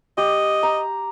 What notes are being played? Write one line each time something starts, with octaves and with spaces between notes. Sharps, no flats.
G4 D#5
A#5